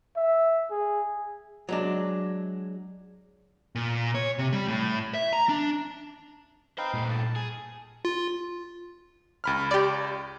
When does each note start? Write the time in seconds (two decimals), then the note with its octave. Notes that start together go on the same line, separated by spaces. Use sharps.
0.16 E5
0.71 G#4
1.69 F#3 G#3 D4
3.75 A#2
4.15 C#5
4.38 C3
4.53 G3
4.68 A2
5.14 E5
5.33 A#5
5.49 D4
6.78 D#4 B4 C5 F5 G5
6.94 G2 A#2 A3
7.10 A5
7.36 G#4
8.05 F4
9.44 C#2 B5 F6
9.71 G4 D5